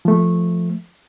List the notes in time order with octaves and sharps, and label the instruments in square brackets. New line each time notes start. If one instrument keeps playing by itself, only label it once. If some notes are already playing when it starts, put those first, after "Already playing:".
[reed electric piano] F3 A3